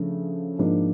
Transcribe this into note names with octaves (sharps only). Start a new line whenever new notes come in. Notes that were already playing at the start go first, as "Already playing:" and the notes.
Already playing: C#3 F3 A3 D4
G#2 F3 A#3 D4